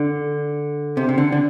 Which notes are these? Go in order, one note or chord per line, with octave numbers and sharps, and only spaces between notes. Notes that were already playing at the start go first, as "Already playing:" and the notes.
Already playing: D3
C3
C3
D3
D3